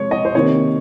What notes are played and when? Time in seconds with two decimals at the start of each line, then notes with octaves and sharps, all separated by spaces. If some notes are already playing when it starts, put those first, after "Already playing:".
Already playing: C3 F3 G#3 C#5
0.11 D#5
0.25 C5
0.34 C3 D#3 A#3 C#5